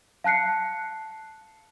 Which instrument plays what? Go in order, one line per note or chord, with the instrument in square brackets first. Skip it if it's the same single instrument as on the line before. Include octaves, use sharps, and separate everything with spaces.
[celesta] F5 A5 F#6 C7 C#7